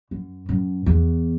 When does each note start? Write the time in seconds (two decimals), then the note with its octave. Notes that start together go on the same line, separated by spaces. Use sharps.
0.11 F#2
0.49 F#2
0.86 E2